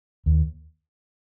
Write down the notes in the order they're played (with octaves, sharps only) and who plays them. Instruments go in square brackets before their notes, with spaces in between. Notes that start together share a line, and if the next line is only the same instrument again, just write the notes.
[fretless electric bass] D#2